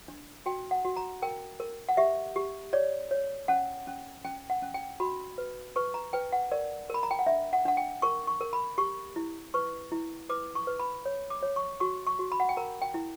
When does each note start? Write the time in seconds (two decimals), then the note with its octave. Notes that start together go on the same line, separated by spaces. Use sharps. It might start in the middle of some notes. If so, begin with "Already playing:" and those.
0.08 D4
0.46 F#4 G5
0.71 F#5
0.85 F#4
0.96 A#5
1.22 A#4 G5
1.60 A#4
1.89 F#5
1.97 G4 E5
2.36 G4
2.73 C#5 D5
3.11 C#5
3.48 C#4 F#5
3.87 C#4
4.25 C#4 G5
4.50 F#5
4.62 C#4
4.74 G5
5.00 F#4 B5
5.38 B4
5.76 B4 C#6
5.94 A#5
6.13 B4 G5
6.32 F#5
6.51 A#4 D5
6.90 A#4 B5
7.03 A#5
7.11 G5
7.19 F#5
7.26 D4 E5
7.53 F#5
7.65 D4 F#5
7.77 G5
8.02 A#4 C#6
8.27 C#6
8.41 A#4
8.53 B5
8.78 G4 C#6
9.16 E4
9.54 B4 C#6
9.92 E4
10.29 B4 D6
10.55 C#6
10.67 B4
10.79 B5
11.05 C#5
11.30 D6
11.43 C#5
11.56 C#6
11.80 F#4 C#6
12.07 C#6
12.19 F#4
12.32 B5
12.40 F#5
12.49 G5
12.57 A#4 A#5
12.82 G5
12.94 E4